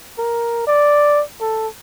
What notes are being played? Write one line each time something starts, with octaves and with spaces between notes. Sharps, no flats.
A#4
D5
A4